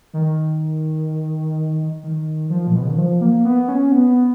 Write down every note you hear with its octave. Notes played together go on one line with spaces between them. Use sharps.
D#3
D#3
F3
A#2
B2
C#3
D#3
F3
A#3
B3
C#4
B3